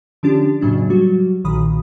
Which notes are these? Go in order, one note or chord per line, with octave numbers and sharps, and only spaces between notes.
D3 F3 C#4 D4 G4
F2 A2 C#3 F#3 A#3 D4
F#3 G3 F#4
B1 A#2 D#3 B5 D#6